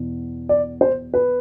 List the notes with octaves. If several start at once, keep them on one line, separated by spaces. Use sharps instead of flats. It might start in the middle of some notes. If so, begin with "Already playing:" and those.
Already playing: E2 B2
D5
C5
B4